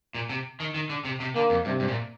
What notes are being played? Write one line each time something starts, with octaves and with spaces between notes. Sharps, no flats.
A#2
C3
D#3
D#3
D3
C3
C3
D3 A#3
F2
G2 C3
G2
A#2